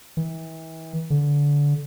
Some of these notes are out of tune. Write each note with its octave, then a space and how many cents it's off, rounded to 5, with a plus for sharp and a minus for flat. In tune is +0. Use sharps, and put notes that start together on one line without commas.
E3 -35
D3 -20